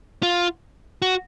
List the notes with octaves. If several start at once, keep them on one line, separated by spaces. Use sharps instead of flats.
F4
F#4